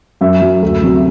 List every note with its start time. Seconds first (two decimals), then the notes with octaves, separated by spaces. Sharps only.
0.21 F#2 E5
0.42 F#3
0.62 D2
0.83 C3 F#3